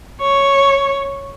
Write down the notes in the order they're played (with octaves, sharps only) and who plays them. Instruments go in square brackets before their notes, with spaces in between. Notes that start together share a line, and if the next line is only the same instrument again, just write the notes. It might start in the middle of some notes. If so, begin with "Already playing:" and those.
[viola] C#5